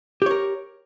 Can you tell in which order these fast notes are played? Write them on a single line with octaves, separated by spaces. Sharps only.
G4 C#5 A#4